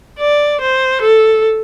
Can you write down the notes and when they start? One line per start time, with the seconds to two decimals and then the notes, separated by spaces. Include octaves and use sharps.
0.19 D5
0.61 C5
1.01 A4